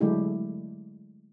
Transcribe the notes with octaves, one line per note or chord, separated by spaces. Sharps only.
D3 F#3 G#3 A3 E4 G4